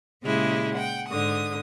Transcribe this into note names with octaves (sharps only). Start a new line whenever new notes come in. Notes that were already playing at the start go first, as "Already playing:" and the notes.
A#2 C#3 G#3 E4 G4
F#5 G5
G#2 D3 D#6